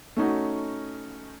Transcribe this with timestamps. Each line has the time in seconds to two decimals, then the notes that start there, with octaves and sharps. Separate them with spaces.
0.17 A3 C#4 D#4 F#4